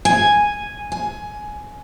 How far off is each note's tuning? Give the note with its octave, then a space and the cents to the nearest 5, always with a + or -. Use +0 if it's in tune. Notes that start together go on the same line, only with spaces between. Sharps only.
G#5 -5
G#5 +15